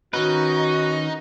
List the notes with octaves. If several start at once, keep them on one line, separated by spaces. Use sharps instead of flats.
D#3 C#4 D#4 F#4 B4